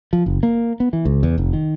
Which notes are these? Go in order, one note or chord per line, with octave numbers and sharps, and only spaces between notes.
F3
F#1
A#3
B3
E3
C#2
E2
F1
D#3